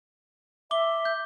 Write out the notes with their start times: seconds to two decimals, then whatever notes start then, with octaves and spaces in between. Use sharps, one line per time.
0.71 E5 D6 G7
1.05 G6